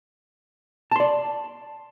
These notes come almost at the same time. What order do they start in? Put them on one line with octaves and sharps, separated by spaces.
A5 C6 D5